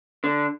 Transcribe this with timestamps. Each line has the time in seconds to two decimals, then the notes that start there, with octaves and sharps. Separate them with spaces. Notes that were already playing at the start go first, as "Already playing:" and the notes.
0.24 D3